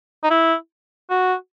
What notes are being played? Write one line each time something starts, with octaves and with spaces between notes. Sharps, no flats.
D#4
E4
F#4